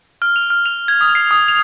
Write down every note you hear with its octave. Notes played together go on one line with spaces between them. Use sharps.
F6
F7
F6
F7
G#6
D#6
C7
D#6
F7